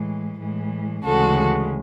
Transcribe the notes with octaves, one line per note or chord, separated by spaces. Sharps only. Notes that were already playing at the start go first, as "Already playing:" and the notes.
Already playing: A2 E3 G#3
A2 E3 G#3
D2 C#3 E3 G#3 F#4 A4